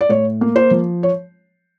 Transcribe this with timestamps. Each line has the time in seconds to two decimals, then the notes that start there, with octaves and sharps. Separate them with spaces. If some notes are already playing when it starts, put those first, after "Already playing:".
0.01 D5
0.09 A2 C#5
0.41 A#3
0.56 C5
0.71 F3
1.03 C#5